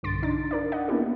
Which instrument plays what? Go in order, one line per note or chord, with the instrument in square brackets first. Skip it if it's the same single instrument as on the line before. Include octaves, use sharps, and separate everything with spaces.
[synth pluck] B1 G2 D3 C6 A6 D7
D4 D#4 A6
D4 A#4 D5
D#5 F#5
A#3 B3 C#4 D4 E4 G4